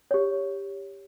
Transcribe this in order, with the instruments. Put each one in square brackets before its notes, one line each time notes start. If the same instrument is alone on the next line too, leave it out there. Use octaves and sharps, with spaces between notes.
[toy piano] G4 C#5